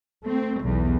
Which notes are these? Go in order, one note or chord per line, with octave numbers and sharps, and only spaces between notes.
A3 C4
B1 E2